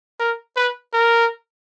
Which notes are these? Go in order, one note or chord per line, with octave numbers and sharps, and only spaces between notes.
A#4
B4
A#4